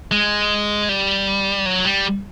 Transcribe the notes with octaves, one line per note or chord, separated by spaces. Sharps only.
G#3
G3
F#3
G3